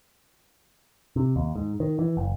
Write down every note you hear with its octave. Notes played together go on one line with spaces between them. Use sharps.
C3
D#2
G#2
D#3
E3
F#1